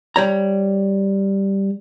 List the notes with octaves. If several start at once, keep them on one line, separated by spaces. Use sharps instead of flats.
G3 C#5 A#5